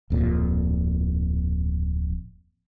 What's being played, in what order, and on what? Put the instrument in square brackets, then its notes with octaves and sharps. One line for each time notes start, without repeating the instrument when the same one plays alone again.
[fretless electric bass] D1 F2 A#2